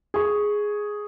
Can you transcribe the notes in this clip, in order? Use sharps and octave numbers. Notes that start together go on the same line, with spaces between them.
G#4 C#6